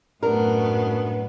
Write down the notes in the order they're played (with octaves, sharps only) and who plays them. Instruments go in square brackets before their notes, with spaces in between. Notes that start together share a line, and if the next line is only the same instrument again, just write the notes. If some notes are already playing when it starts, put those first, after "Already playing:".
[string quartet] F#2 A2 B3 [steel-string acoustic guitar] D4 A#4